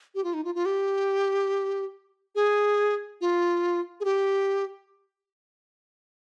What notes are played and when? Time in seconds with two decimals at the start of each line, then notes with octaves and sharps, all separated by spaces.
0.15 G4
0.24 F4
0.34 D#4
0.45 F4
0.55 F4
0.66 G4
2.35 G#4
3.21 F4
4.00 G#4
4.05 G4